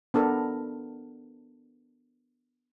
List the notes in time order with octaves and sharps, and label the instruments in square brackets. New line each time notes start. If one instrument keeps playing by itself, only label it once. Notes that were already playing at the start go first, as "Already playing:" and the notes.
[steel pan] B3 D4 A4 A#4